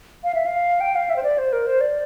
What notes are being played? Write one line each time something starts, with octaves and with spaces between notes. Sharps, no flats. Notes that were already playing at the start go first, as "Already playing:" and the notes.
F5
E5
F5
G5
F5
E5
C5
D5
C5
A#4
C5
D5